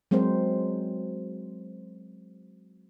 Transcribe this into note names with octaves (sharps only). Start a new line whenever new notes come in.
F#3 G#3 C4 A#4 C5